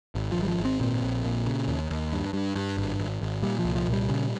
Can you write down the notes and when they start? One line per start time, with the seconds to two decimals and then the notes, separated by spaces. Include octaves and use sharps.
0.15 G#1
0.32 F3
0.37 G#1
0.43 G3
0.48 F3
0.59 G#1
0.65 C4
0.81 A#2 C4
1.03 A#1
1.25 A#2
1.46 C#3
1.68 D#2
1.91 D#2
2.12 G2
2.33 G2
2.56 G2
2.77 G#1
2.99 G#1
3.21 G#1
3.43 A#2 G3
3.59 F3
3.65 C2
3.75 F3
3.87 A#2
3.93 G3
4.09 C#3